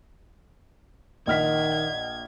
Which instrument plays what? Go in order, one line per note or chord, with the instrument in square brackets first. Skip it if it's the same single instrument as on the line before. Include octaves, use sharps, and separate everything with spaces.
[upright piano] A#1 F6 B6 [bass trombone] D#3 [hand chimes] D#5 F#5 [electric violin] G#6